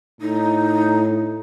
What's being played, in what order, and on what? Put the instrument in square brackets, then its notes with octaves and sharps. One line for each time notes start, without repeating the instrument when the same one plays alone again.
[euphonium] A2 [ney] D#4